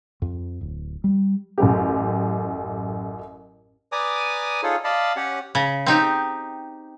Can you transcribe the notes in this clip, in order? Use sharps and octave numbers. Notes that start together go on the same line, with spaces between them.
F2
D1
G3
A1 F#2 G4
B4 D5 G#5 A#5 D6 D#6
D#4 F4 G#4 A4 C#5
D5 D#5 F5 A5 B5
C#4 G4 C#5 F#5
C#3
C4 D#4 G4